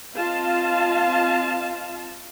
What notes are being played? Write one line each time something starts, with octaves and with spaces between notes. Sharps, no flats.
C4 F4 D#5 F5 A5